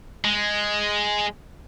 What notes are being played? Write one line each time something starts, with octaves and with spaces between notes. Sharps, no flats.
G#3